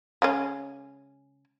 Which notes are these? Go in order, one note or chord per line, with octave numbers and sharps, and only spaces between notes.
C#3 G#3 C#4